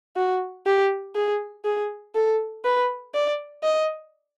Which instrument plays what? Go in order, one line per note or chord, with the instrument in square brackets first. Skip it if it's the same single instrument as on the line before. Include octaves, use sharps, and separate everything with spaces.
[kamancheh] F#4
G4
G#4
G#4
A4
B4
D5
D#5